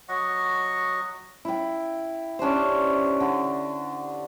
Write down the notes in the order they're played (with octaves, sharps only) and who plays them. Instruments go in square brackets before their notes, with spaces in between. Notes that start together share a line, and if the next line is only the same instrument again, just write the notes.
[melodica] F#3 D#5 F#5 C#6
[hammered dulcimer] E4 G5
C#4 D4 G4 C5
D3